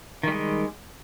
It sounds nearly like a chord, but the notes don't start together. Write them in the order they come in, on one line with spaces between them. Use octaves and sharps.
D#3 G3 G#3